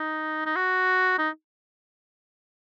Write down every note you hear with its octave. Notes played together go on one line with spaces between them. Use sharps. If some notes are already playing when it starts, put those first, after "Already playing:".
Already playing: D#4
D#4
F#4
D#4